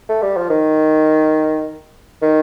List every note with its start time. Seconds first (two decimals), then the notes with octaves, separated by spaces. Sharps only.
0.09 A3
0.22 G3
0.37 F3
0.50 D#3
2.22 D#3